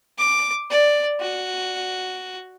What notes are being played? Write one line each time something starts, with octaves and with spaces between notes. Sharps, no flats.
D6
D5
F#4